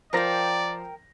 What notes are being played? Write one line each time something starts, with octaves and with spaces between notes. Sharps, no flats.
F3 A#4 C5 D5 G5 A#6